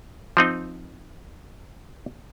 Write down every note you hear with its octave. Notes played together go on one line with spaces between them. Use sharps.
F3 C4 D#4